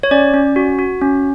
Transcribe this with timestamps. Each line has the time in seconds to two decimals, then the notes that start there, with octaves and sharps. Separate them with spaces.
0.03 C#5
0.11 C#4 D5
0.34 C#4
0.56 F#4
0.79 F#4
1.02 C#4